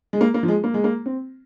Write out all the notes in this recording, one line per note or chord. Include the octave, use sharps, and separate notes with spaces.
G#3
A#3
A#3
F3
G#3
A#3
G#3
A#3
C4